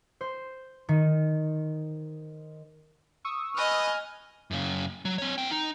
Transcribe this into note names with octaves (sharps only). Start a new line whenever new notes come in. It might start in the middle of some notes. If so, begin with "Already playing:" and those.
C5
D#3
C#6 D#6 E6
B4 D#5 G#5 F6
F#2 C#3
F#3
C4 C#5
B3 G5
D#4